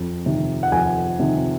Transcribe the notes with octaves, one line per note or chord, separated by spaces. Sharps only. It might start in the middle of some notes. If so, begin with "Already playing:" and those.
Already playing: F2
C3 D#3
F#5
F2 G#5
C3 D#3